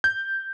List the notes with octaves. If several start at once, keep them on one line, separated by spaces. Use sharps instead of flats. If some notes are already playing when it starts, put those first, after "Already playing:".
G6